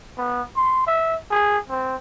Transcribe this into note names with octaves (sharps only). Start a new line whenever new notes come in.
B3
C6
E5
G#4
C4